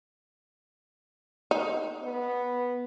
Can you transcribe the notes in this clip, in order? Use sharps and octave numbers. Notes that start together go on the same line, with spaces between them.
D#4
B3